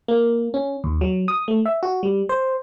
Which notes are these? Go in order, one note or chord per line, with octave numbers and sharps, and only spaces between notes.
A#3
C#4
D#2
F#3
D#6
A3
E5
F#4
G3
C5